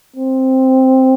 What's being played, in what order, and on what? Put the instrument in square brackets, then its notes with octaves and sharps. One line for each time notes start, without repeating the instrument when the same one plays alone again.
[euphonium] C4